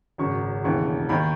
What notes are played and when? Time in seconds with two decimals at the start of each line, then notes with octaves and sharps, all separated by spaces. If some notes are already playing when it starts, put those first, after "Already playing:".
0.18 G#1 F#2 C#3 C#6
0.64 E1 D#2 C#3 E3 C#6
1.09 D#2 D#3 B5